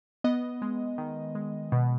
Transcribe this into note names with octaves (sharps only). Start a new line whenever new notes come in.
B3 D#5
G#3
D#3
G#3
B2